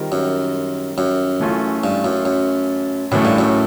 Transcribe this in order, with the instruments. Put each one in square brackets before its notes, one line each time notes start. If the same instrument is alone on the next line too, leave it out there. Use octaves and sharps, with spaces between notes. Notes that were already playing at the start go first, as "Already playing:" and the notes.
Already playing: [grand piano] D#3 G3 C4 F4 A#4
[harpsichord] F#2
F#2
[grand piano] E3 A3 C#4 F4
[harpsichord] G2
F#2
F#2
[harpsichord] F#2 [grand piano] A2 E3 A3
[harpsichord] G2
F#2